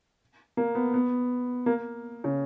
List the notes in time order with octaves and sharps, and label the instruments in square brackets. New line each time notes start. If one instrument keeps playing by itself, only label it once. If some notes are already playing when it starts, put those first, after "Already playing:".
[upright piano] A#3
B3
B3
A#3
C#3